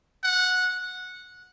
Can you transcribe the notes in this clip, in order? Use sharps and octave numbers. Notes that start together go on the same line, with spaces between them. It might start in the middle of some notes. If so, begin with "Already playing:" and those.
F#5